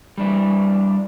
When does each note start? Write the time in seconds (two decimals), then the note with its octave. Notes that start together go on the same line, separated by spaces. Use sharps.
0.18 G3 D4 E4